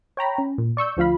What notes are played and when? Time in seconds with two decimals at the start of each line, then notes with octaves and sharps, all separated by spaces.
0.17 C#5 G5 A#5 B5
0.38 C#4
0.58 A#2
0.77 D5 C#6 E6 G6
0.97 D2 F3 F4 F5 B5